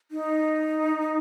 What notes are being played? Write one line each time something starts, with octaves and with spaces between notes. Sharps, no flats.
D#4